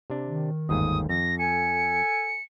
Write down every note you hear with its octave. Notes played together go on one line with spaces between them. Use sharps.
C3 D4
D#3
G1 D#2 G#2 D#6
F2 A#6
A4 G#5 C#7